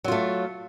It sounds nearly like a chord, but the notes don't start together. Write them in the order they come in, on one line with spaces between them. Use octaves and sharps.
F#3 F4 A3